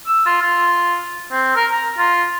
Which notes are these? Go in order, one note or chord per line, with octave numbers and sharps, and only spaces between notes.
E6
F4
F4
C4
A#4
A#5
F4